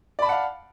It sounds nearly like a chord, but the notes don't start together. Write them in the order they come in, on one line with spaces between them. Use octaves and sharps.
D5 B5 A5 F#5 F5